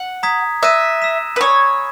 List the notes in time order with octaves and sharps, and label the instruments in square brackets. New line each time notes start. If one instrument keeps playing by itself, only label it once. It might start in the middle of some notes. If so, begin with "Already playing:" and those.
Already playing: [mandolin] F#5
[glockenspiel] A#5 D#6 G#6 B6
[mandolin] E5 [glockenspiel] D#6 F#6 A#6 D#7
[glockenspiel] E6 B6 E7
[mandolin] B4
[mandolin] C#5 [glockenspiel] G#5 B5 D#6 G#6